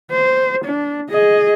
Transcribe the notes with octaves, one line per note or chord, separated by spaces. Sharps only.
C5
D4
G#4 D#5